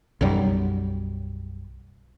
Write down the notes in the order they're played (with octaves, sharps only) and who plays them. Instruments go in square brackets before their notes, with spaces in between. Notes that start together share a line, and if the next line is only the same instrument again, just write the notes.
[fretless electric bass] B1 F#2 F#3 G3